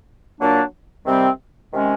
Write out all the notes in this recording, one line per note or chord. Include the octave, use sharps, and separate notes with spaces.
A#2 F#3 A#3 D4
C3 D#3 G3 C4
C3 D#3 G#3 C#4